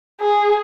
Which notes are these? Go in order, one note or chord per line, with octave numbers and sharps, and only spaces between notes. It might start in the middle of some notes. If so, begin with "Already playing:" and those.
G#4